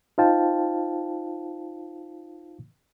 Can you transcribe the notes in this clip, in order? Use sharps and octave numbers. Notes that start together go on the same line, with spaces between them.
D#4 F4 C5 F5 G5 A5